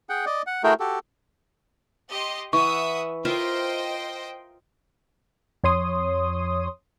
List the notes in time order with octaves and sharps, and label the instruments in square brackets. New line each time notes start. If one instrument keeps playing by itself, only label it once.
[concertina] G#4 F#5 G5
D5 D#5
F#5
A3 E4 F#4 G#4 A#4 G5
F#4 G4 A4
[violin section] G4 D#5 C6
[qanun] E3 [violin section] E5 F#5 D#6 [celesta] C#6
[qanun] F4 A#4 E5 [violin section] C5 D#5 G5
[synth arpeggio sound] F2 C#5 C6 D#6